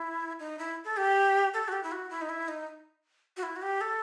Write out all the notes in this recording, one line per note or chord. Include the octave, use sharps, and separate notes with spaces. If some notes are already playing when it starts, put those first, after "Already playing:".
Already playing: E4
D#4
E4
A4
G4
A4
F#4
G4
E4
F#4
E4
D#4
E4
D#4
F#4
E4
F#4
G4
A4